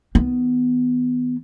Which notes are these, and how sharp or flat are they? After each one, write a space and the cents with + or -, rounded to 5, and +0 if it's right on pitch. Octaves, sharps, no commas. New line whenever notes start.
D#3 +20 B3 +15